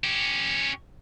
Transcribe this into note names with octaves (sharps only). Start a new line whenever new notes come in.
C#4 G4